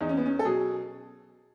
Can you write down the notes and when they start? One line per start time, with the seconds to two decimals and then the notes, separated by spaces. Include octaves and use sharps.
0.01 E2 D#4
0.09 C#4
0.17 B3
0.26 C#4
0.39 A4
0.45 B2 F#3 G#4